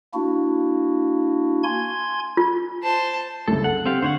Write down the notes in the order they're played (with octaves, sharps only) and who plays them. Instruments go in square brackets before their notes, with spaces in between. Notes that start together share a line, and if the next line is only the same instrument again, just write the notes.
[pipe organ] A#3 D4 E4 F#4
G#5 C6 G#6
[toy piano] F4
[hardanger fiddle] C5 A5
[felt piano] C2 F#2 C#3 [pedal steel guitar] A4
[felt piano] A4 [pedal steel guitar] F#5
[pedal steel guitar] C4 G4 F5
[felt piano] D3 [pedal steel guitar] C5 C#5 F#5